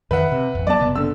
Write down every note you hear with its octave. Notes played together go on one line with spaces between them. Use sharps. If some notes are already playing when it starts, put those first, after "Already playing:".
F2 D#3 B4 E5 F#5
C3
A1 F2
F#3 B3 D5 A5
F#1 C3 B3
D3 E6